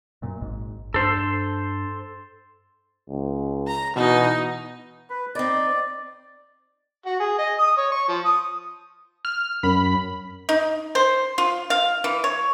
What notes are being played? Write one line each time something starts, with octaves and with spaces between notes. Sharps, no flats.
F#2 A#2
G#1 G#2
G2 D4 A4 C5
C#2
A#5
B2 E3 D#4
B4 B5
C4 D#4 D5
F#4
G#4
D#5
D#6
C#5
C#6
F3
D#6
F6
F#2 B5
D#4
C5
F4
F5
E3
C#5